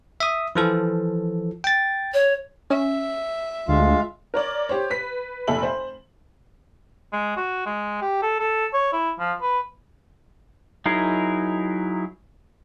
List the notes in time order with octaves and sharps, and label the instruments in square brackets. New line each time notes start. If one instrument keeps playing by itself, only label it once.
[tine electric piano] E5 D#6
E3 F3 A4
G5 A6
[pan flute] C#5
[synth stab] C#4 [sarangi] E5
[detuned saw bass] D2 [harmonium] G#3 F4 F5
[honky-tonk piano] A#4 C#5 D5
G4 C5 C#5
B4 B6
F1 A#2 A4 E5 F#7
C5
[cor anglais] G#3
F#4
G#3
G4
A4
A4
C#5
E4
F3
B4
[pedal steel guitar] F#3 D#4 E4 G#4 A#4